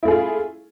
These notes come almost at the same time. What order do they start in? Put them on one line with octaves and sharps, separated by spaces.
E4 A3 G#4 F4